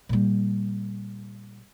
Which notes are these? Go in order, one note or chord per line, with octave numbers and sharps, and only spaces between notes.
A#2 G3